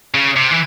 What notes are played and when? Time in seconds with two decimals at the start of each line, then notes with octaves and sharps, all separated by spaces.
0.15 C#3
0.36 C3
0.51 E3